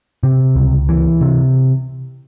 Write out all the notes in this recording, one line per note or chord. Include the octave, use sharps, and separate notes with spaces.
C3
C#2
E3
C3